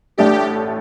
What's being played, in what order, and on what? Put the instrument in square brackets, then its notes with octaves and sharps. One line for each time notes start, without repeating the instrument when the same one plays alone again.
[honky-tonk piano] A1 A2 A3 D4 [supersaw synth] G4